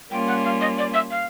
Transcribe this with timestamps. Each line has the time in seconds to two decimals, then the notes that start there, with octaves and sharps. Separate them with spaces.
0.11 G3 A#3 C#4 F4 G5
0.28 F#5
0.44 F5
0.61 D#5
0.78 D5
0.94 E5
1.11 F5